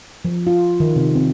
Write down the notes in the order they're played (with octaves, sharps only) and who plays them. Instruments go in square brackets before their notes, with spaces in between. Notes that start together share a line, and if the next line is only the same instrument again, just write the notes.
[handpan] F3
F4
D#3
C3
C4